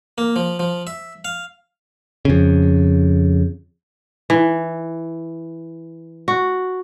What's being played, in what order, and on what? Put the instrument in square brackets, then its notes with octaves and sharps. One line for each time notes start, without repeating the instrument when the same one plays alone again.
[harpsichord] A#3
F3
F3
E5
F5
[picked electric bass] F2 C#3
[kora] E3
F#4